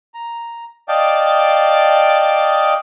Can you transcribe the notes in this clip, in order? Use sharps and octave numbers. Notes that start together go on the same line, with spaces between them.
A#5
D5 D#5 F5 G5 A5 D6